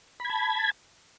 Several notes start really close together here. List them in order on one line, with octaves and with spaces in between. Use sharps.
B5 G#6 A5